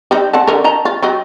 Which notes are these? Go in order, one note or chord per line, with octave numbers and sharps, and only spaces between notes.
G3 C4 D#4
C4 F#5 A5
D3 A#4
D#5 A5 A#5
F4
F#3 C4 D#5